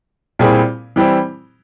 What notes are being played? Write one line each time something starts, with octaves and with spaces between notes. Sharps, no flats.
A#2 G3 C4 E4 G#4
E3 G3 C4 E4